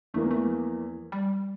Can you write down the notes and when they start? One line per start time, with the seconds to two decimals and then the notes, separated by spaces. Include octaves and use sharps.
0.14 E2 E3 A3 A#3
0.31 A3
0.47 F3
1.12 G3